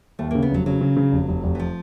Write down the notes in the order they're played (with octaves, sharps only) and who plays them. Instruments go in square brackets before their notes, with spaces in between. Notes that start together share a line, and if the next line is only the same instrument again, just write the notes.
[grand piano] D#2 [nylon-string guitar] A3
[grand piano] C#3 [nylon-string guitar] A#3
[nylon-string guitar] B3
[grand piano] F1 [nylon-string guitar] F#3
[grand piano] C#3 [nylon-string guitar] F#3
[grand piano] C#3
C#3
F1
F1
F1
[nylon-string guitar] E3
F3